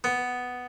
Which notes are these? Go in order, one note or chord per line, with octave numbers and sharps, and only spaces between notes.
B3